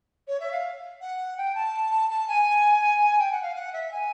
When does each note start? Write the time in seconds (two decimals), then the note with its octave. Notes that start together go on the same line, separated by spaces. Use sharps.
0.28 C#5
0.40 E5
0.52 F5
1.01 F#5
1.37 G5
1.55 A5
2.10 A5
2.28 G#5
3.19 G5
3.31 F#5
3.42 F5
3.55 F#5
3.73 E5
3.92 G#5